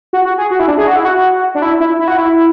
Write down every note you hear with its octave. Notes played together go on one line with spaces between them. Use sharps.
F#4
F#4
G#4
F#4
E4
D4
G#4
F#4
E4
F#4
D4
E4
E4
E4
F#4
E4